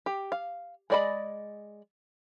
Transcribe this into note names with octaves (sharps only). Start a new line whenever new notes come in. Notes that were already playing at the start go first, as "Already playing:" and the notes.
G4
F5
G#3 G#4 D5 D#5 B5